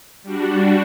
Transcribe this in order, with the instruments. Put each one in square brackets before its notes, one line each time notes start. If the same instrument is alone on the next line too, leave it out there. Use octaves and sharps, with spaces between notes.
[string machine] G3 D4 F#4